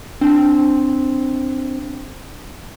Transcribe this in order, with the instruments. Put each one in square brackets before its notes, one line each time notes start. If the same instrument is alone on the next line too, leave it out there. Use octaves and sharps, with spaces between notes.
[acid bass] C4 [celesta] D4